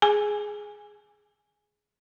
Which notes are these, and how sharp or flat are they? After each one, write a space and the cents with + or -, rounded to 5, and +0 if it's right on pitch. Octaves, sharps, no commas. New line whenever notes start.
G#4 +5 G#5 +0